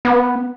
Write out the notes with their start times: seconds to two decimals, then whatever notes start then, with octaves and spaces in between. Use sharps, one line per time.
0.05 B3